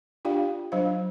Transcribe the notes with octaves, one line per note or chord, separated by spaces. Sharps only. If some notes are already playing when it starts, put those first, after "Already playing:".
D4 F4 G4 D5 F5 G5
F#3 D4 C5 F5